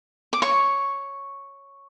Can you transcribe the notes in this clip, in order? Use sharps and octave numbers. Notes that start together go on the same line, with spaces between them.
D6
C#5 C#6